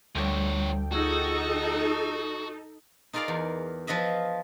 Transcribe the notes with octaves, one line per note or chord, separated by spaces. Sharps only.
D2 D3 F3 G3 C#5 G5
D#4 F4 F#4 G#4 A4 E6
D#4 F4 G#4 A#4 D5 F5
E2
F3 F4 B4 D#5 E5